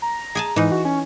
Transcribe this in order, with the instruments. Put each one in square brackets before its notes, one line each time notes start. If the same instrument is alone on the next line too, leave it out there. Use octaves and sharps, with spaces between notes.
[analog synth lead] A#5
[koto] G#4 G#5 A5
[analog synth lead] G#2 [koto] E3 D#4
[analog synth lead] F#4
C#4